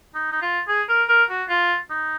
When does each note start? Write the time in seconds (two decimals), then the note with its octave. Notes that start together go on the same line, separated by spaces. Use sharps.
0.15 D#4
0.32 D#4
0.42 F4
0.68 G#4
0.89 A#4
1.09 A#4
1.30 F#4
1.49 F4
1.90 D#4